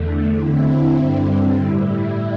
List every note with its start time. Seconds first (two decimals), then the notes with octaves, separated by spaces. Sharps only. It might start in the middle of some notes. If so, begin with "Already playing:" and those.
Already playing: E2 D3 A3
0.32 D3 C4 E4
0.95 G2 D3 G3 C4
1.59 A2 G3 E4